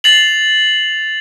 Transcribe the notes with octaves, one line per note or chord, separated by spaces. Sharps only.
A6 C7 F7 F#7